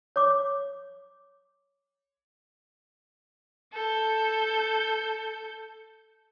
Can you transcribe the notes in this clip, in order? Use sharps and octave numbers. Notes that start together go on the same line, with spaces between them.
C#5 D6
A4 G6